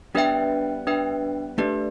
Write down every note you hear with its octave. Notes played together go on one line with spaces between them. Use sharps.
G3 B3 D4 B4 E5 G5
D4 B4 E5 G5
A3 D4 G4 B4 D5